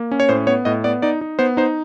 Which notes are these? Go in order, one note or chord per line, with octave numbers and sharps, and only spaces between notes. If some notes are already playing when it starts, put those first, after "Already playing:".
Already playing: A#3
C#4
C#5
A2 C5
B3 C#5
A2 D#5
B3 D5
D#4 D5
D#4
B3 C5
D#4 C5